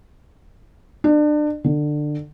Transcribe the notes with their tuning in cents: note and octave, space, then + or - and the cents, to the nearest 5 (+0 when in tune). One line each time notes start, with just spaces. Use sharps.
D4 +30
D3 +20